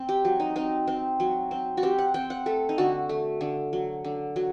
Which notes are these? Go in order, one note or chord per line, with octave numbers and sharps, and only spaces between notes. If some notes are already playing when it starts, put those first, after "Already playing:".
Already playing: C4
G4
F#3
D#4
C4 D#4
C4
F#3
C4
F#4
C4 G4
F#5
C4 G5
F#5
A3 A4
D#4
D3 F#4
A3
D3
F#3
D3
F#3